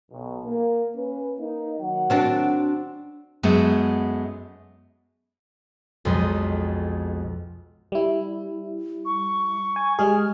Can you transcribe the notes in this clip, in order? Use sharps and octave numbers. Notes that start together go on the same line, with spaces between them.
B1
A#3
C#4 B4
A#3 D#4
D#3 F#3 F#5
C4 D4 F#4
F#2 G#3 A3 B3
B1 F2 G#3 C6 D#6
G3 E4
C#6
G#5
G3 G#3 G#4 F6